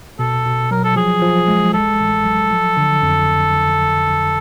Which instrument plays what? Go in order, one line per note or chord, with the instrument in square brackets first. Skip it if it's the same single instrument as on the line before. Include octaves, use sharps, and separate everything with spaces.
[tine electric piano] B2 [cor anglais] A4
[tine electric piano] B2
[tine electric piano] F#3 [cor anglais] A#4
[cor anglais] A4
[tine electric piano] F3 [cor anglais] G#4
[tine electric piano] F3
G#3
[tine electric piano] A1 [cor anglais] A4
[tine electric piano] A1
F#3
F3
D3
F2